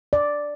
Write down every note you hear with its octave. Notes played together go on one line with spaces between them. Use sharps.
D5